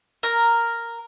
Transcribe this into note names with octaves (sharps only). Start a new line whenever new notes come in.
A#4